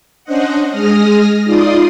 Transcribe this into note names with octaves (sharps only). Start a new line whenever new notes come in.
C#4 D4 C5 D#5 F#5
G#3 G#4 D#6 F6 A#6
D#4 F4 D5 C6 D#6